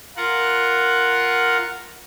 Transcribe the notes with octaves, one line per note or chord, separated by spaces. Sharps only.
F4 A#4 F#5